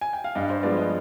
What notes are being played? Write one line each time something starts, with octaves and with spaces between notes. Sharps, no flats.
G#5
G5
F5
G2 D#5
C5
F3 G#3 B3 D5
D#5